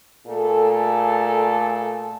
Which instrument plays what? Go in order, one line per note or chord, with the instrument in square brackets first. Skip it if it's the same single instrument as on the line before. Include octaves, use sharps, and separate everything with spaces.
[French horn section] A#2 A3 G#4 A4